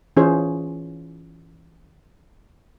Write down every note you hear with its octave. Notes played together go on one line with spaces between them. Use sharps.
E3 C#4 F4 G#4 C5